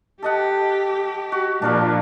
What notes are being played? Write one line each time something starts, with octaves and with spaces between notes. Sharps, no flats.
G4 A4 D#5 F#5
F#4
A#2 F3 D4 A#4 F5